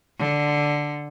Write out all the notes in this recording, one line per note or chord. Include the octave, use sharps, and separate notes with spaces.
D3